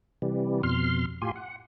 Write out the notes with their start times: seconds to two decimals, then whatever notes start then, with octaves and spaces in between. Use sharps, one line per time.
0.22 C3 E3 G3
0.63 F2 B2 C6 F6
1.22 A2 F4 G4 G#5 C6
1.36 F#5